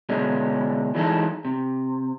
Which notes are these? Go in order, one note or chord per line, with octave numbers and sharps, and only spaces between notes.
B2 D3 G#3 C#4
E3 F#3 G#3 D#4 A4
C3